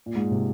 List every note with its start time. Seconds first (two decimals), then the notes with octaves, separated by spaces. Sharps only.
0.06 A#2
0.16 G#2
0.31 C3